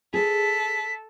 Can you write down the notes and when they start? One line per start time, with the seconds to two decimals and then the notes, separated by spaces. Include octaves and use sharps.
0.14 G#4 A4 B4 B6